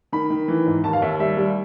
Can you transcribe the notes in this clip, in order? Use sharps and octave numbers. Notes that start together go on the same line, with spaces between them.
D#3 B5
D#3
E3
G#2
D#2 A5
F5
D#2 E5
G3 E5
G3